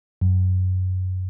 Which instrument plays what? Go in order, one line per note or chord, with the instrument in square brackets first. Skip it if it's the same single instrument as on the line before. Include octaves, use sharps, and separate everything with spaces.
[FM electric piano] F#2